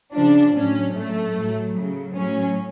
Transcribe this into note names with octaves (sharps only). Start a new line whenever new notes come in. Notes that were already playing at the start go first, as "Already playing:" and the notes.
C#3 F3 D4
A2 F#3 C#4
A2 F#3 A3
A2 F#3
C#3 F#3
A2 F#3 C#4